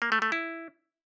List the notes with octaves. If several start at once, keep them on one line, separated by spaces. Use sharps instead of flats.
A#3
A3
A3
E4